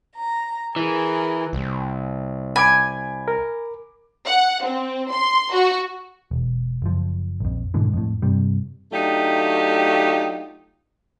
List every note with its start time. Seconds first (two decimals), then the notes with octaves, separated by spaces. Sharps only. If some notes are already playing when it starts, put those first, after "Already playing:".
0.17 A#5
0.76 E3 G#4 A#4
1.53 C2
2.56 G#5 B5 D6 D7
3.28 A#4
4.26 F#5
4.64 C4
5.11 C6
5.54 F#4
6.31 E1
6.82 F#1 F3
7.40 A#1 F2
7.74 G#2 B2 D3 E3
7.93 F2 A2
8.22 G2 C3 G3
8.92 F#3 A3 D4 D#4 F4 G4